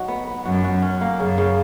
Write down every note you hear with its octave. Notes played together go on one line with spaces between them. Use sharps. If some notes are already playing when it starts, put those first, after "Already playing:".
Already playing: F#3 D#4 F#4
B3
B3
F#2 F#4
F#4
C#4
A#3
F#2 C#3
C#3